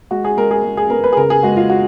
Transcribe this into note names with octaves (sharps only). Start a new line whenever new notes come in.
G#3 F#4
G#4
G#3 A#4
G#4
G#3
G#4
B3 A#4
B4
G#4
C#3 A#4
G#4
G#3 F#4
F4
F#4